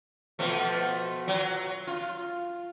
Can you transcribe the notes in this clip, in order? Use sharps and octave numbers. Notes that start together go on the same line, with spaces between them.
B2 F3 A3
F#3
F4